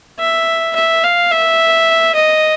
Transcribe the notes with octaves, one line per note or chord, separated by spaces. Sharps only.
E5
E5
F5
E5
D#5